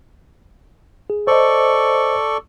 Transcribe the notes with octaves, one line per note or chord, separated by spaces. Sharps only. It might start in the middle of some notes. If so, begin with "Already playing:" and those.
G#4
A4 C5 D5 D#5 C#6